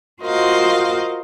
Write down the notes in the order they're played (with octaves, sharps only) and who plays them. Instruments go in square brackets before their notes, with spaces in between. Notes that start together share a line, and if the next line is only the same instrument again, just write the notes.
[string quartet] F4 F#4 A#4 C5 D#5 F5